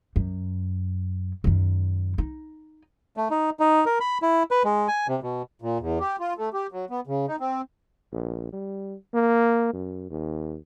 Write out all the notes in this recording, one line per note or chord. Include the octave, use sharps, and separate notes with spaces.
F#2
F#2 D#3
D#4
A3
D#4
D#4
A#4
B5
E4
B4
G#3
G#5
C3
B2
A#2
E2
G4
F4
A3
G4
F#3
B3
C#3
D#4
C4
A#1
G3
A#3
F#2
D#2